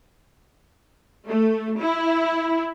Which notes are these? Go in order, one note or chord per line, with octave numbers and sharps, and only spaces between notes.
A3
E4